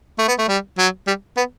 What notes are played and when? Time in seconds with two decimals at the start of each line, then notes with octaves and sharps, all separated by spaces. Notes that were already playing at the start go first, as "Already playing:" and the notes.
0.18 A3
0.28 B3
0.39 A3
0.48 G3
0.78 F#3
1.07 G3
1.37 B3